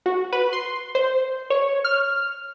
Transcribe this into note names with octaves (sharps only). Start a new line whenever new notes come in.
F#4
B4
C6
C5
C#5
F6